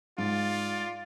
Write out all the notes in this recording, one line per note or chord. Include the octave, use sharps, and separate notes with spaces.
G#2 F4 D5